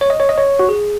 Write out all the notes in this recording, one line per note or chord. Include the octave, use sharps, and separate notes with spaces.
C#5
D#5
C#5
D#5
C#5
F#4
G#4